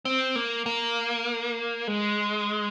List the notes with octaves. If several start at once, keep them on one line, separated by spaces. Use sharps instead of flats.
C4
A#3
A#3
G#3